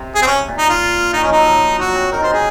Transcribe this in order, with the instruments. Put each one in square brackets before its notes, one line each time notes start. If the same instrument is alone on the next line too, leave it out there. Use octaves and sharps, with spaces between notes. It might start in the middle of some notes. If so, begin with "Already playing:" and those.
Already playing: [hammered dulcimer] C3
[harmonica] G#4
C4
C#4
[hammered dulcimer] A#2
[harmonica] D#4
F4
D#4
[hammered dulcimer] D#3
[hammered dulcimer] F3 [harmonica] C#4
[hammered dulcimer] F#3 [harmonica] D#4
[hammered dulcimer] F3
[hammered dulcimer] F#3 [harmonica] F#4
[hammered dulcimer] C4
[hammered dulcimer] D#4 [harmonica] A#4
[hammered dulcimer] F4 [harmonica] C5
[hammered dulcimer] D#4 [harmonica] G#4